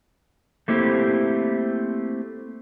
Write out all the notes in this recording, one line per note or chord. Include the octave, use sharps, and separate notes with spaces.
A3 A#3 C4 E4 G4